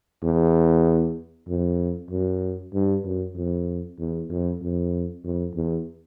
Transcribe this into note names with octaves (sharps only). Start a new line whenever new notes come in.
E2
F2
F#2
G2
F#2
F2
E2
F2
F2
F2
E2